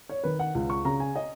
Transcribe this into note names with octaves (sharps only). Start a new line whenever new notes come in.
C#5
D#3 B4
F#5
C#2
C#6
C#3 A#5
G#5
D#5